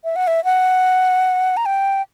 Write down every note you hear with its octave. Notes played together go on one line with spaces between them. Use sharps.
E5
F#5
E5
F#5
A#5
G5